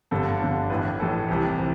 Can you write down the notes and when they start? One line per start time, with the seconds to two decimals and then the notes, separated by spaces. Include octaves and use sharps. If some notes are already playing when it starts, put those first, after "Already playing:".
0.11 G1 G2 D3 A4
0.40 G1 G2 D3
0.70 A1 A2 E3 B4
1.00 A1 A2 E3 A4
1.28 C2 C3 E3 G4
1.58 C3 E3